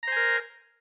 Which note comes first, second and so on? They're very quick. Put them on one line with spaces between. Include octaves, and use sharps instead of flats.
A#5 C5 G#5 A#4